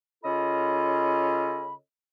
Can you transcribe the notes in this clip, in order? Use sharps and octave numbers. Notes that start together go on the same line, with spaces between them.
C#3 C#4 F4 A4 D#5 B5